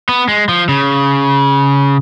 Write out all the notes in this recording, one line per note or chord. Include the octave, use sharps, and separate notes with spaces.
B3
G#3
F3
C#3